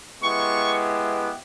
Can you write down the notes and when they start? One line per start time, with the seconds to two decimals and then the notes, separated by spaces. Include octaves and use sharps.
0.22 G#3 B3 E4 G4 C#6